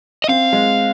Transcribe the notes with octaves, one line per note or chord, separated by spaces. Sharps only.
D#5
C4 F5
G#3